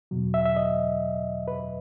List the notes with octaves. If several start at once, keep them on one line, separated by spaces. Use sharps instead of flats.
E2 B2 F#3
E5
E5
D#5
B4